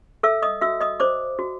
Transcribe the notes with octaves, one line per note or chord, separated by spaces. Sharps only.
A4 E5 E6
D#5 D#6
F#4 E5 E6
D#5 D#6
C5 D5 D6
F#4